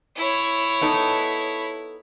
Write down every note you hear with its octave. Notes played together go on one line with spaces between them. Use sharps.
E4 C#5
B3 D#4 A4